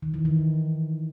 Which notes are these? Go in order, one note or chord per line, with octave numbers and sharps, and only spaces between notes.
D#3
E3
D#3